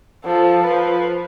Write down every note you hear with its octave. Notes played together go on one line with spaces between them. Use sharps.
F3 A4
F3 B4